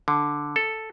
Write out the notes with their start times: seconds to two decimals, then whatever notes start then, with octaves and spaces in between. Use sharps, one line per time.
0.08 D3
0.56 A4